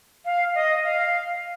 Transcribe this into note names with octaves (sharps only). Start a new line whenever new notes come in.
F5
D#5
F5